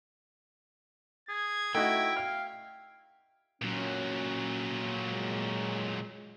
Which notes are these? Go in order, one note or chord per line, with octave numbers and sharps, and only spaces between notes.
G#4 G#6
A3 D#4 E4 F#4 G5
F5 F6
A#2 F#3 C#4
G#3